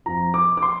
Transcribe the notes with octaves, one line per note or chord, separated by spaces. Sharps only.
F2 F3 A#5
D6
D6
C6